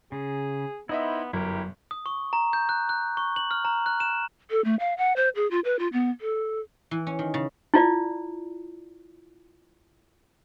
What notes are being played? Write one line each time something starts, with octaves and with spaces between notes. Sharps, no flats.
C#3 G#4
B3 D#4 E4 C5 D#5 E5
G1 F#2 F#3 E4 G4 A#4
D#6
C#6
A#5
G6
F#6
F#6
C#6
F#7
F6
A#5
F#6
E7
A4
A3
F5
F#5
C5
G#4
F4
B4
F4
B3
A4
E3
C#4
D#3
C#3
E4 F4 D5